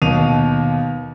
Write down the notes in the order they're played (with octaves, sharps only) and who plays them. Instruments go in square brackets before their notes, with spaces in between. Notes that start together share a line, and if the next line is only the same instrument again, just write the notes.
[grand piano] D#2 B2 D#7 F7